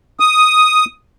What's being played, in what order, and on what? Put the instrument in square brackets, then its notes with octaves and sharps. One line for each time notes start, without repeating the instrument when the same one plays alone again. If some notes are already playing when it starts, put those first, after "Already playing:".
[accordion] D#6